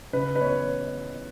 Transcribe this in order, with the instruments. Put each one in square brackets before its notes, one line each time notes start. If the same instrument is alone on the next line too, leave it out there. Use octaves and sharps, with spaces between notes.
[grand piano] C#3 B4
B4
B3 C#5